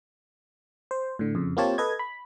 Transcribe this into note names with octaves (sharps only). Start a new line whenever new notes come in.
C5
A2 D3
F2 C#3
A#3 C4 F4 G4 C#5 A5
A4 B4 D#5 G#6
B5